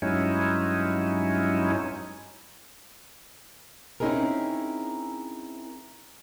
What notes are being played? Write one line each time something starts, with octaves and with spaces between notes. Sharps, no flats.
G2 F#3 G#3 C#4 D#4 E4
C4 C#4 D#4 E4 G#4 A#4